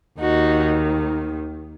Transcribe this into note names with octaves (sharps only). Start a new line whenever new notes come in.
D#2 D#3 D#4 F#4